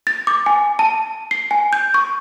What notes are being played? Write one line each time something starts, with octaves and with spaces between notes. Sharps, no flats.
A6
D6
G#5
A5
C7
G#5
G6
C#6